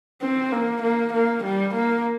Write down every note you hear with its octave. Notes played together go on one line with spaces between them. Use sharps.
C4
A#3
A#3
A#3
G3
A#3